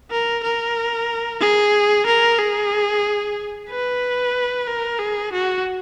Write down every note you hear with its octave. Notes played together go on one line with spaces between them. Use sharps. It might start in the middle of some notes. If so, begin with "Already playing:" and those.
A#4
A#4
G#4
A#4
G#4
B4
A#4
G#4
F#4